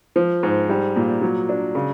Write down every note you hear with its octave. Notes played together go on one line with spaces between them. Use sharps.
F3
G#2
G3
A#2
F#3
D4
C#3